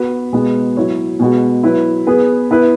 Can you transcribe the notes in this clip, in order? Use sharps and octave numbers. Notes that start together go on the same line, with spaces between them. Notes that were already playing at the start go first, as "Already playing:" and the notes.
Already playing: B3 F#4 B4
B2 G#3 B3
F#3 E4 C#5
B2 G#3 B3 F#4
F#3 E4 B4
B3 G#4 B4
B3 E4 B4